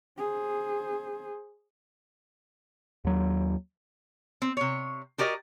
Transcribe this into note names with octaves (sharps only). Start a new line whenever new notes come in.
G#4 C5
D#2 F#3
C4
C3 C#5
F#4 G4 A#4 D5 D#5